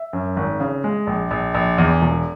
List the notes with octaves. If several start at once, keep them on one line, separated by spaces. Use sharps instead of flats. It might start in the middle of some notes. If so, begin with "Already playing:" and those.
Already playing: E5
F#2
G#1
C#3
G#3
A#1
A#1
A#1
E2
E1